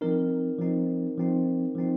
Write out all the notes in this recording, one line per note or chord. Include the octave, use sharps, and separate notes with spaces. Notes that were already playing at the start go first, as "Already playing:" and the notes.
F3 C4 D#4 A#4
F3 C4 D#4
F3 C4 D#4
F3 C4 D#4